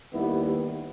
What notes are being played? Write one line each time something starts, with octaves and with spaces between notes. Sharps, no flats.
D#2 D#3 G3 B3 E4